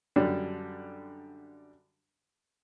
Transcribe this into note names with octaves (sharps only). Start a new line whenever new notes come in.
F#2 D3 G3 D4